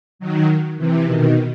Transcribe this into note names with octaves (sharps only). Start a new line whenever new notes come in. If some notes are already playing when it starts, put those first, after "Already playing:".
D#3 F#3
C3 E3
B2 D#3